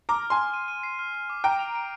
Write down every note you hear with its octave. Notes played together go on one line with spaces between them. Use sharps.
A#5 D6 F6
F6
G#5 C6
F6
D#7
D#7
C7
F6
F6
D6
G5 A#5 D7
F7
D7